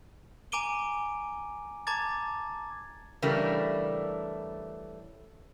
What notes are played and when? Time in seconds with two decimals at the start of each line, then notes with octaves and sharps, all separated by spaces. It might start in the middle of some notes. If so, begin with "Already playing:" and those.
0.52 G#5 A#5 D6 D7 D#7 G7
1.87 A5 A#5 D6 G#6 A6
3.22 C#3 E3 G3 A3 D4 A#4